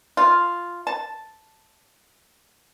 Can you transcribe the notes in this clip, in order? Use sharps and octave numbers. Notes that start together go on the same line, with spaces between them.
F4
A5